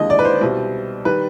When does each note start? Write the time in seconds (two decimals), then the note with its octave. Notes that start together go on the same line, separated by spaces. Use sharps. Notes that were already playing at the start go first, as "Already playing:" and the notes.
Already playing: D#2 D3 F3 G#3 D#5
0.10 D5
0.19 B4
0.25 C5
0.41 C2 B2 G3
1.05 D#3 G3 B4